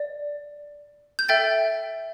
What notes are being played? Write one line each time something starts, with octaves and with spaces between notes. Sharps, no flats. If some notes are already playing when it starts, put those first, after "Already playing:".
Already playing: D5
G6
A4 E5 G5 A6